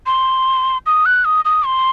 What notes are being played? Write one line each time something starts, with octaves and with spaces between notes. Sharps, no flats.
C6
D#6
F#6
D#6
D#6
C6